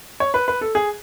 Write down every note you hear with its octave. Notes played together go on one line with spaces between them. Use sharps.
C#5
B4
B4
A4
G#4